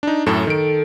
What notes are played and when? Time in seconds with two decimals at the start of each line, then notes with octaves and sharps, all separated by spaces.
0.03 D4 D#4
0.26 F#2 A2 A4
0.47 D#3 D7